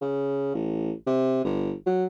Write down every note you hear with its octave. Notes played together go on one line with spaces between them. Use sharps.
C#3
A1
C3
G1
F#3